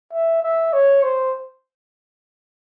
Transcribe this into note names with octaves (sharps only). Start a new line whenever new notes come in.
E5
E5
C#5
C5